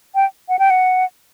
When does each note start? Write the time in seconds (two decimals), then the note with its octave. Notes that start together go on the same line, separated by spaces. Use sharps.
0.15 G5
0.49 F#5
0.59 G5
0.70 F#5